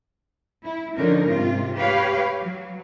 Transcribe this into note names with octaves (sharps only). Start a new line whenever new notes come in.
E4
D3 F3 C#4 D#4 A#4
G#2 C3 F4
G4 B4 C#5 F5
F#3